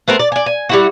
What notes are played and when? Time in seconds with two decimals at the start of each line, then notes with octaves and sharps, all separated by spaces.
0.08 A3 B3 C4 A#4
0.19 D5
0.32 D5 G#5
0.46 G#5
0.69 G3 E4 F#4